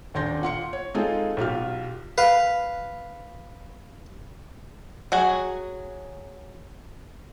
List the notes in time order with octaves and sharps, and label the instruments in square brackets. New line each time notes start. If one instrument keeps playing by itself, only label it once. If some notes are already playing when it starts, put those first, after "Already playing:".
[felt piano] D#1 D#2 D4 C6 G6 A#6
A#2 F#5 C6 C#7
C#5
G#3 C4 D#4 F4 G#4 A4
B1 F4 G4 F6
[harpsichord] B4 F5
[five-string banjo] F#3 F#4 G#4